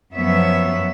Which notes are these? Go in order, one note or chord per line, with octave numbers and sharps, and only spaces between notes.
F#2 F3 B3 C#5 E5